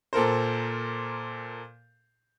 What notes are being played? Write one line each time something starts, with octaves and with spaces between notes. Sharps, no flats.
A#2 A4 A#4 C5